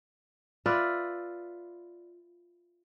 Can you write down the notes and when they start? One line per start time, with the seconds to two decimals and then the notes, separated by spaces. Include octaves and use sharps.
0.66 F4 B4 D5 E5